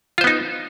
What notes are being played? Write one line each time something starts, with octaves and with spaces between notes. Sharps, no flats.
B3 D#4 F4 C5